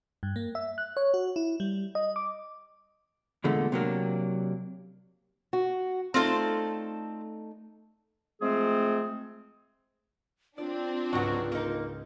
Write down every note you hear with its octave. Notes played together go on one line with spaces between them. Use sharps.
G2
A#3
E5
F#6
C#5
F#4
E4
G3
D#5
D6
E2 A#2 D3 G#3 A3
C3 F#3 A#3 D4
F#4
A3 C4 D4 D#4 F4 A4
F3 G#3 A3 C4 G#4
C4 D4 F4 D5
C#2 G#2 F#3 F#4
A#3 D#4